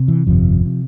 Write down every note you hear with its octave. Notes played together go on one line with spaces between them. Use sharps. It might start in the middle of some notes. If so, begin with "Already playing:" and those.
Already playing: C3
E3
G1 F2 C3 F3
C3